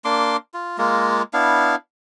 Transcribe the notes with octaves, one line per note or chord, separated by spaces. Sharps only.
A#3 D4 C6 D6
F4
G#3 A#3 F4
B3 D4 E4 F5